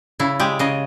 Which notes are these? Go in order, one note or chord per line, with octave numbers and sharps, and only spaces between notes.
C#3 E4
G#3 G4
C#3 D#5